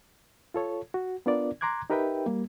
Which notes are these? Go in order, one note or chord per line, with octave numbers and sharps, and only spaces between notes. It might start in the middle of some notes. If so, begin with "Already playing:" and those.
F4 A4 C#5
F#4
B3 D4 F4 A#4 D5
A#5 C6 D6 F#6 G#6
D#4 G4 A#4 B4 E5 G5
G3 A#3